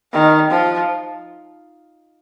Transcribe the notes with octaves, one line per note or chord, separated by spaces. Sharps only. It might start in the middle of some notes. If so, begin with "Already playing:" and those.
D#3
F3